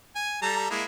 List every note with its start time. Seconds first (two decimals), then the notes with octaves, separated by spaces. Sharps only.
0.16 G#5
0.42 G3 A4 A#5
0.71 G#3 A#3 E4